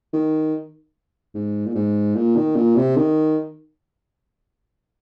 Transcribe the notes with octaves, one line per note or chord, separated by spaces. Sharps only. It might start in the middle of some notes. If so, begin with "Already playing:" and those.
D#3
G#2
A#2
G#2
A#2
D#3
A#2
C3
D#3